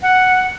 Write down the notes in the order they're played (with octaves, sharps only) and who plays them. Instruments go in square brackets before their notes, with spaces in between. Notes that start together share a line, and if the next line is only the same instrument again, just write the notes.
[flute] F#5